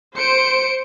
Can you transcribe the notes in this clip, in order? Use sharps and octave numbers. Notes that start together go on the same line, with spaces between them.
C5 C#7 D7